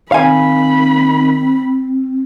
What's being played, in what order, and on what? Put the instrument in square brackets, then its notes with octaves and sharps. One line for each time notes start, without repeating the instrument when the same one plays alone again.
[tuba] D#3 [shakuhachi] C4 [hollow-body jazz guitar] F5 G#5 [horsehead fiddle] B5